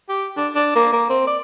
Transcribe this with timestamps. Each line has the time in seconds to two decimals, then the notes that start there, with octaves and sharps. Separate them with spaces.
0.09 G4
0.37 D4
0.55 D4
0.76 A#3
0.93 A#3
1.10 C4
1.27 D5